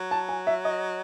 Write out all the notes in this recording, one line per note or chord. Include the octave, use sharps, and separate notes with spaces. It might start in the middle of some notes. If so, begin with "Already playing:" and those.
Already playing: F#3
A5
G#5
E5
D#5